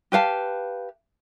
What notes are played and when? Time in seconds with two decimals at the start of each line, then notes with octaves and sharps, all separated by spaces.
0.12 G4 B4 F5 A5